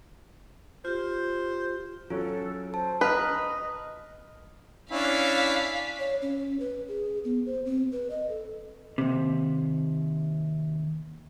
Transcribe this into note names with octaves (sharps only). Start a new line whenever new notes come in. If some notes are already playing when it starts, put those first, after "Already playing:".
F4 G4 C5
F#3 C#4 F4 A4
C5 A5
B4 D#5 A#5 D#6 F6 F#6
C#4 D4 E4 F5 B6
C#5
C#4
B4
G#4
B3
C5
C4
B4
D#5
A4
D#2 C3